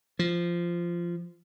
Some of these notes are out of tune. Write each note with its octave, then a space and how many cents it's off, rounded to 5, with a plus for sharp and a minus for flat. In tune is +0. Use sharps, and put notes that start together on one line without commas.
F3 -15